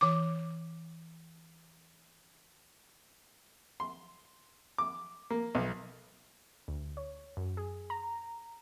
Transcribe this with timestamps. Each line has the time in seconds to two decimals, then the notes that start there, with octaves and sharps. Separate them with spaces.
0.01 E3 D6
3.80 C6
4.78 D6
5.30 A#3
5.55 B1
6.68 D2
6.97 C#5
7.37 F#2
7.57 G#4
7.90 A#5